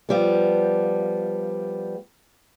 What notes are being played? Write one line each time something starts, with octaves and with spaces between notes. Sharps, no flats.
F3 G3 B3